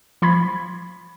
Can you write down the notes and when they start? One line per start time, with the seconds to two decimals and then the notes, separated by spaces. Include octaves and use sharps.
0.22 F3 B5 C6 G#6